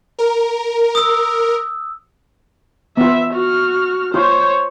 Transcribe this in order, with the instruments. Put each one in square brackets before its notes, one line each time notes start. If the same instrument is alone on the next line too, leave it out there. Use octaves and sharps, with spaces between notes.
[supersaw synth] A#4
[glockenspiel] D#6 E6
[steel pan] B3 F4 [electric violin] E5
[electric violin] F#4 F6
[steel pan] F4 [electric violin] C5 C#5